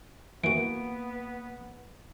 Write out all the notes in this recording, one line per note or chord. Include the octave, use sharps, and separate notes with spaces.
E3 A#3 B3 F#4 D7